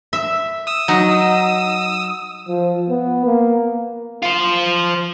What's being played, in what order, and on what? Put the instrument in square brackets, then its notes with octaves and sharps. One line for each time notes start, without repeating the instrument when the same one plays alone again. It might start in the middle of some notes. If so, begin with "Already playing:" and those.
[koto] E5
[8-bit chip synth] D#6 E6
[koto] F#3 D#4
[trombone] F3
B3
A#3
[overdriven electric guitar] F4 C5